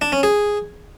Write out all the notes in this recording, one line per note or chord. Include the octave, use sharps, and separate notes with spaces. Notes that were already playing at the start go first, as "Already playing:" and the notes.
D4
C#4
G#4